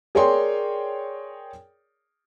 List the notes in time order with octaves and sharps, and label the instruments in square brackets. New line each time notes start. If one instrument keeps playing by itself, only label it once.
[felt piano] G#4 A#4 C#5 D5 G5 C6